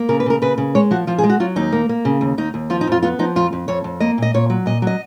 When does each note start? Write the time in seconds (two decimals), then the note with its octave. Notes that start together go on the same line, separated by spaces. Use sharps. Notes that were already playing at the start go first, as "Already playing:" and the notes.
Already playing: A#3
0.09 C#3 A#4
0.20 B4
0.26 C#3 A#4
0.42 C#3 B4
0.58 C#3
0.75 G#3 C#5
0.91 F3 F#4
1.07 F3 F4
1.18 G#4
1.24 G#3
1.30 F#4
1.40 F#3 F4
1.56 D#2 D#4
1.72 A#3
1.89 A#3
2.05 C#3
2.21 D#2
2.38 D#2 D#4
2.54 D#2
2.70 F3 F4
2.81 D#4
2.87 F2 F4
3.02 B3 F4
3.19 F3 D#4
3.36 F2 F4
3.53 F2
3.68 F2 C#5
3.84 F2
4.00 A#3 D#5
4.18 A#2 D#5
4.34 A#2 C#5
4.50 F#3
4.66 A#2 D#5
4.82 F#3 D#5